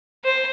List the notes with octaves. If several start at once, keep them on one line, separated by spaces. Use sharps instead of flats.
C5